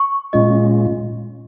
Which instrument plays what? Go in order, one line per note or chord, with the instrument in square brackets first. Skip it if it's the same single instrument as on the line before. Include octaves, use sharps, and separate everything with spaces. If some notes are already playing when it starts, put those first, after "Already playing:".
Already playing: [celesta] C#6
[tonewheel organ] A#2 G#3 C#4 F4 [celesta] D#5